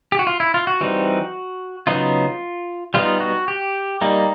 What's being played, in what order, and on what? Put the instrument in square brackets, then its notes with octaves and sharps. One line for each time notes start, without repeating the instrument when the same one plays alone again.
[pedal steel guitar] G4
F#4
F4
E4
F4
F#4
E3 G3 C4 D#4
C#3 F#3 B3 D#4 F4
G3 B3 D#4 F4
F#4
G4
G3 A#3 D#4